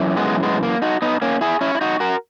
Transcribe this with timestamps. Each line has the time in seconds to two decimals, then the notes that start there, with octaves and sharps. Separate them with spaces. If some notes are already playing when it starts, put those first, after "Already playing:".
Already playing: F#2 E3
0.17 G#3 B3
0.43 G#3 B3
0.63 A#3
0.82 D#4 F#4
1.02 B3 D#4
1.22 A#3 C#4
1.41 E4 G#4
1.61 C#4 E4
1.75 E4
1.81 D#4 F#4
2.00 F#4 A#4